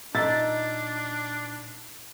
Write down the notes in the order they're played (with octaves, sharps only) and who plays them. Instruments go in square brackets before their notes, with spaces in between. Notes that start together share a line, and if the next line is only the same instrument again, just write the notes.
[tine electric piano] A#2 [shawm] D4 [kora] D#4 E5 [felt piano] A6